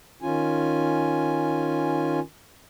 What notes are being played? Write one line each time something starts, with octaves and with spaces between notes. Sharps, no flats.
D#3 C#4 F4 G#5